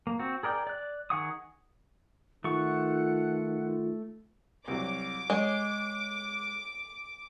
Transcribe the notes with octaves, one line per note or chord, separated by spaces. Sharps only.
A#3
C4 F#4
G#4 A#4 D5 G5
D5 F#6
D#3 G#4 F#5 C#6 D#6
D#3 A3 F4 F#5 C#6
C2 F#3 D6
G#3 C#5